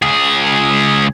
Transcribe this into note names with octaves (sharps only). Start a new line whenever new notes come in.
C#2 G#4